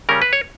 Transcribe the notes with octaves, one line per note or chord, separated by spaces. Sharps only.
C#3 G3 C#4 A#4
B4
C#5